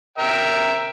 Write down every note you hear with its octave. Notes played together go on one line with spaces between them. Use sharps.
A#4 E5 G5